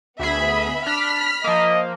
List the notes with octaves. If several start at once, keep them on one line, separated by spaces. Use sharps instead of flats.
D2 B3 G#4 E5 B5
D4 B5 F6 B6
F3 A#3 D#5